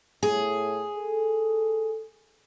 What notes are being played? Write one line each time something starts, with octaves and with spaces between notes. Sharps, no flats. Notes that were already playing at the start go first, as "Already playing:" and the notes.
A2 G#4
A4